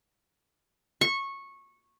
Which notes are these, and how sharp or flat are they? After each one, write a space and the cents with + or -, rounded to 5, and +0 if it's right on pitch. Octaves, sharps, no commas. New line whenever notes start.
C#6 -15